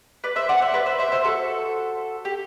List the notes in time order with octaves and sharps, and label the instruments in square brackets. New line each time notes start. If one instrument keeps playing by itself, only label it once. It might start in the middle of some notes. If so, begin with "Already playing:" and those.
[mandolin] B4 D5
C5 E5
D5 F#5
C5 E5
B4 D5
C5 E5
C5 E5
C5 E5
F#4 A4
G4